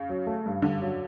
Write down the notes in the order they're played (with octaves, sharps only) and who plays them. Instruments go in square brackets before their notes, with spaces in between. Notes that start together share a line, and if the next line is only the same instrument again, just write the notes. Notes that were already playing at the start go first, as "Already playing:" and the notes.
Already playing: [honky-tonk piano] C#3
[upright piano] F#3
A3
G2
[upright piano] G2 [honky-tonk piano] D3
[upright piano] F#3